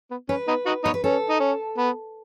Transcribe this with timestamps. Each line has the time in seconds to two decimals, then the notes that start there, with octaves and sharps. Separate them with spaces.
0.11 B3
0.29 C#4 B4
0.47 B3 D#4
0.66 D#4 F#4
0.84 B3 D#4 C#5
0.94 B4
1.04 C#4 A4
1.30 D#4
1.40 C#4
1.78 B3